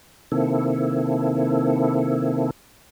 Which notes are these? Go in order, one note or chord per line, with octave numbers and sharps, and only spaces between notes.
C3 D#3 A#3 C4 E4 A4